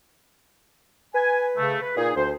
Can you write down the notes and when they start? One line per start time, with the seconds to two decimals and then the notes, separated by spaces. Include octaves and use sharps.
1.15 B4 G#5
1.56 C#3 A3
1.82 B4
1.97 A#2 D#4 G#4
2.16 D2 C5